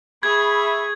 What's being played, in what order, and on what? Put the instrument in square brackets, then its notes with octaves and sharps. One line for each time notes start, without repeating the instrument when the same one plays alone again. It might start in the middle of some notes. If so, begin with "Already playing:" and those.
[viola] G#4 C#6 [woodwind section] E5 B5 [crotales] G#6